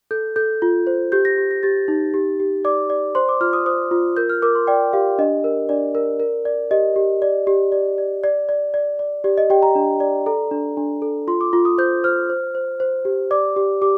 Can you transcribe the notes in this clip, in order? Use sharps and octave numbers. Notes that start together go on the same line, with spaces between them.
A4 G6
A4 G6
F4
C5
G4 G6
A#6
G4
A#6
G4 A6
D#4
G4
G4
D5 D6
D5
C5 C6
D6
F4 F6
D#6
C5 D#6
F4
A#4 G6
F6
A#4 D6
C6
D5 G5
G4 F5
D4 D#5
A#4
D4 D5
A#4
A#4
D5
G4 D#5
G4
D5
G4
D5
D5
D5
D5
D5
D5
G4 D5
D#5
G4 G5
A#5
D4
D5
A4 A#5
D4
D4
A4
F4 C6
D6
F4
D#6
C5 G6
C5 F6
C5
C5
C5
G4
D5 D6
G4
G4 D6